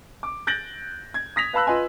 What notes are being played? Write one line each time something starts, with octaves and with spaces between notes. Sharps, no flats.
D6
F#6 G6 A6 A#6 D7 F#7
G#6
D#6 A#6 B6 F7
B4 F5 A5 B5 E6 F#6
F4 B4 D#5 G#5 C6